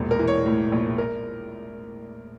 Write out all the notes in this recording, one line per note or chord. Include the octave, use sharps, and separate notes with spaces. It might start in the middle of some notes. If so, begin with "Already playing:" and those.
Already playing: E1 A#1
A#4
E3
C#5
A2
A#1
A#4